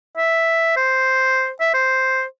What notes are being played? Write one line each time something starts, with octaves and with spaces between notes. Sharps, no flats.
E5
C5
E5
C5